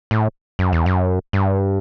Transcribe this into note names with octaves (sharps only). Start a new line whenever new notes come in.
A2
F#2
E2
F#2
G2